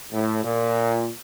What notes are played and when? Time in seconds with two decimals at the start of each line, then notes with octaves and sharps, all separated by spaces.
0.13 A2
0.44 A#2